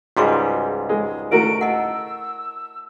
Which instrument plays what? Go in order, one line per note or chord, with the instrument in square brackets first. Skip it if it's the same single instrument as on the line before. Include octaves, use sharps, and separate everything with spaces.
[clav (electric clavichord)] C#2 G#2 G3 [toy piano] F#4 G#4 C#6
[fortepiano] G#3
[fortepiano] A3 F#4 A#4 [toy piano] E4 [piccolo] D7
[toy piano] D#5 F#5 [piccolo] E6